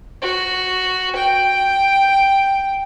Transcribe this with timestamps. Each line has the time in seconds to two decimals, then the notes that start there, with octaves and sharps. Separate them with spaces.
0.22 F#4
1.16 G5